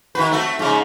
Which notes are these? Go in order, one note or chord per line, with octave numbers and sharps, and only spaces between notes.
D#3 F#4 B4
A3 C4 F#4
G#2 C#3